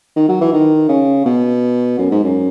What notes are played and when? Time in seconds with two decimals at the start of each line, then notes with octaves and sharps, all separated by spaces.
0.16 D#3
0.28 F#3
0.40 E3
0.53 D#3
0.89 C#3
1.25 B2
1.98 F#2
2.11 G#2
2.24 F#2